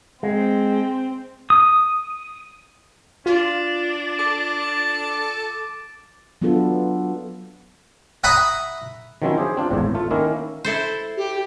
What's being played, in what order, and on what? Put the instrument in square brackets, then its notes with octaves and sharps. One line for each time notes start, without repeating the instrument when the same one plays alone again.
[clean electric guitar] G#3 [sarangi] C4
[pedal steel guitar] D#6
[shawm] D4 [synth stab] F4
[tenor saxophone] A4 [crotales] D6 A6 D7
[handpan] F#3 B3 D4 F4 A4
[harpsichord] E5 F#5 A#5 B5 D#6
[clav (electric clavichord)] D#3 F3 F#3 C4 C#4 E4
G4 G#4 C5
C4 D4 F4
G#1 E2 A2
A3 F4
D#3 A#3 C#4 E4 A#4
[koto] E4 A4 C5
[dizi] G4